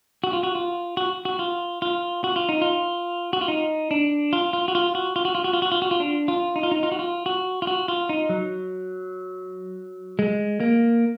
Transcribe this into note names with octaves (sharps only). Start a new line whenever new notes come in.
F#4
F4
F#4
F4
F#4
F#4
F4
F4
F#4
F4
D#4
F4
F#4
F4
D#4
D4
F4
F4
F#4
F4
F#4
F4
F#4
F4
F#4
F4
F#4
F4
F#4
F4
D4
F4
D#4
F4
D#4
F4
F#4
F4
F#4
F4
F#4
F4
D#4
F#3
G#3
A#3